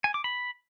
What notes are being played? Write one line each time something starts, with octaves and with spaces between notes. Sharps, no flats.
G#5
D6
B5